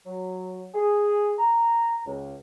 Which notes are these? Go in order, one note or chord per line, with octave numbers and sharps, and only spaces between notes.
F#3
G#4
A#5
C#2